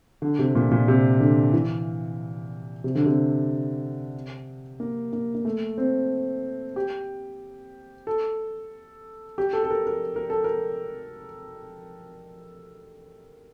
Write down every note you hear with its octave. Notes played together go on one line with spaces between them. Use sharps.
D3
C3
A#2
A#2
C3
D3
E3
C3
D3
C3
A#3
A#3
A#3
A3
C4
G4
A4
G4
A4
A4
A#4
A#4
A#4
A4
A#4